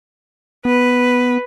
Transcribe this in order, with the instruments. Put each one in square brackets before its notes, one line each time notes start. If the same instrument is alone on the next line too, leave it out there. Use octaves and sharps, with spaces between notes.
[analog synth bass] B3 [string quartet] B4